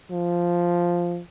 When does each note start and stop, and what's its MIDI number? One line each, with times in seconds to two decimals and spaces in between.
0.11 1.21 53